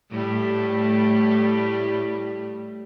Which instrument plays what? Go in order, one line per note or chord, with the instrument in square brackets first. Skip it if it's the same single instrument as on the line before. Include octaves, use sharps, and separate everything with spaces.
[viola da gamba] A2 G3 A3